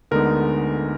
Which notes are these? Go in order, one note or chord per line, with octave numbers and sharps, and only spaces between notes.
D2 D3 G#3 B3 D#4 A#4